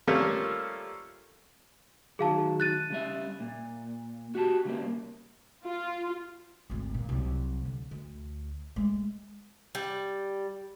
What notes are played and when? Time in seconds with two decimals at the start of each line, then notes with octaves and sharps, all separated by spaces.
0.07 F3 G3 A3 A#3 C#4 F4
2.19 D#3 F#3 G#4 F5 A5
2.60 F#6 A6 D#7
2.90 C#3 G3 E5
3.40 A#2
4.35 F#4 G4 A5
4.65 C#3 G3 A#3
5.65 F4
6.70 G#1 D2
6.94 A#2
7.09 C2 F#3
7.65 D3
7.91 D2
8.76 G#3 A3
9.75 G3